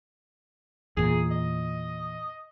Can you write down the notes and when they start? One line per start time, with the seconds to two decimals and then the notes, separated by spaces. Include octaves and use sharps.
0.97 E2 A#2 G#4
1.31 D#5